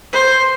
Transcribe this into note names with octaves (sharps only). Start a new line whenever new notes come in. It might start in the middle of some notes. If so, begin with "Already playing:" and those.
C5